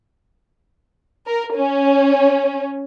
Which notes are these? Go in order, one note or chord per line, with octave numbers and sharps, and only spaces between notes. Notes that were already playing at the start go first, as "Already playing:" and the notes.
A#4
C#4